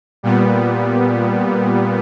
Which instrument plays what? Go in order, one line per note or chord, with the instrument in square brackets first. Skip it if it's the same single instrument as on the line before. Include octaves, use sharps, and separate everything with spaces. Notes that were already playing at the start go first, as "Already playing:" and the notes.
[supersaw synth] A#2 G3 B3